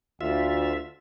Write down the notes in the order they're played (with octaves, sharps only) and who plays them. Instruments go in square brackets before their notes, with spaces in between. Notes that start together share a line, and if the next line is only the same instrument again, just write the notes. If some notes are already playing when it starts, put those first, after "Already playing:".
[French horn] D2 [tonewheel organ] F4 E5